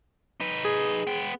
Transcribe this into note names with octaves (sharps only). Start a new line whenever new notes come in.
D#4 B4
G#4
B3 G5